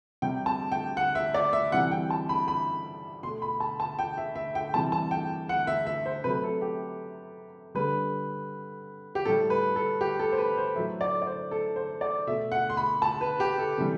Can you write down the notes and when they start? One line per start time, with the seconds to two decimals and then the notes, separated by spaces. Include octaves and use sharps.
0.22 C3 G3 G5
0.46 A5
0.72 G5
0.97 F#5
1.15 E5
1.34 D5
1.53 E5
1.72 C3 E3 G3 F#5
1.91 G5
2.10 A5
2.29 B5
2.48 B5
3.23 B2 C6
3.26 A3
3.42 B5
3.60 A5
3.80 A5
3.99 G5
4.18 E5
4.35 E5
4.55 G5
4.74 C3 E3 G3 A5
4.92 A5
5.11 G5
5.49 F#5
5.67 E5
5.87 E5
6.06 C5
6.24 C3 F#3 A3 B4
6.44 A4
6.61 G4
7.75 D3 G3 B4
9.15 G4
9.25 A2 G3 A4
9.50 B4
9.76 A4
10.01 G4
10.19 A4
10.32 C5
10.38 B4
10.57 C5
10.76 A2 F#3 A3 E5
11.01 D5
11.22 D5
11.26 C5
11.51 A4
11.76 C5
12.01 D5
12.27 B2 A3 E5
12.52 F#5
12.70 C6
12.77 B5
13.02 A5
13.21 B4
13.40 G4
13.58 A4
13.77 C3 E3 G3